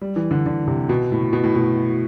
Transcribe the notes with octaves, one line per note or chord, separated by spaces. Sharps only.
G3
E3
D3
D3
C3
B2
A2
B2
A2
B2